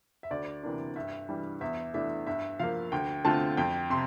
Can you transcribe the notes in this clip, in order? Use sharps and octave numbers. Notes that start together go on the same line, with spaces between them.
E5
D2 D5
C3 E3 A#3 D4
G2 E5
E3 G3 D4
E2 E5
E3 A3 D4 E5
G2 E5
F3 A#3 F5
D2 G5
D3 A3 C4 F4 A5
F2 G5
C3 C6